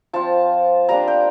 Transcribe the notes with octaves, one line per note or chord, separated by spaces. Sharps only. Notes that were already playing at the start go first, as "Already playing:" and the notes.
F3 C4 F4 A5
G3 A#3 D4 A#5
G5